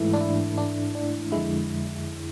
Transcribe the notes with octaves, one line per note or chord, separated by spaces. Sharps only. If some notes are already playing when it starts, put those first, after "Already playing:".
Already playing: G#2 E3 A3 E4
D4
E4
D4
D4
F2 D3 G#3 E4